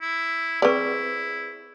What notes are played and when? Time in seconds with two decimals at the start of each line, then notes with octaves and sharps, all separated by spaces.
0.01 E4
0.62 C4 E4 G#4 B4 D5 C#6